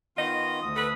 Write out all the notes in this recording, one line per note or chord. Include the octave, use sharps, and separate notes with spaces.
D#3 B3 F4 D#5
D2 D#6
A4 B4